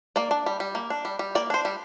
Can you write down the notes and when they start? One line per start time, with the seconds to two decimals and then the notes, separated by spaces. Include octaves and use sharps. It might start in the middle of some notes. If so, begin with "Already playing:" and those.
0.16 A#3 D5
0.31 D4
0.46 G3
0.60 G3
0.75 A#3
0.90 D4
1.05 G3
1.19 G3
1.35 A#3 D5
1.50 D4 C5
1.65 G3